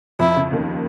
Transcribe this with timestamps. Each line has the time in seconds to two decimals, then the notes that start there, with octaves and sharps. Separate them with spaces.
0.19 F2 F3 E4
0.36 C#3
0.52 D#2 D#3